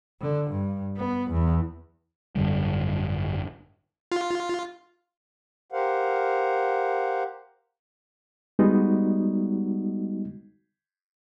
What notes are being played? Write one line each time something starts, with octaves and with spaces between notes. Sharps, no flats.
D3
G2
B3
E2
G#1 F#2 D3 G3
F4
G4 A#4 C5 F5 F#5
G3 G#3 B3 D#4 F#4